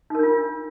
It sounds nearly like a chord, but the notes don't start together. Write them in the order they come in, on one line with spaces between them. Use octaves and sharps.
D#4 A#4 D4 F4